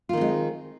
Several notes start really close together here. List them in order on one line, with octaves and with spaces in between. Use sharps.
F4 D#3 C4 G#3